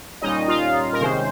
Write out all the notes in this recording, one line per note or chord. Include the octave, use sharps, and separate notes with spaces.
A#2 G3 C#4 D#4 D#5
F4 F5
A#4
C3 D#3 G#3 C#4 C5